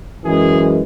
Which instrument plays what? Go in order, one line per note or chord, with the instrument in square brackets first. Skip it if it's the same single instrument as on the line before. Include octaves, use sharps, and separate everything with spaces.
[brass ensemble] F#2 E3 G#3 G#4